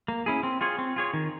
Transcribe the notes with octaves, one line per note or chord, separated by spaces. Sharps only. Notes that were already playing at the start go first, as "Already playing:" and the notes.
A#3
C#4 E4 G#4
C4
F4 G#4 C#5
C4
F4 G#4 C#5
D#3